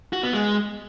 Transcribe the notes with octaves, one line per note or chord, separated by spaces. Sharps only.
F#4
B3
G#3